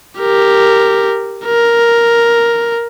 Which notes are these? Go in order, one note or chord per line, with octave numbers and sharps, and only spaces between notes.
G4 A#4
A#4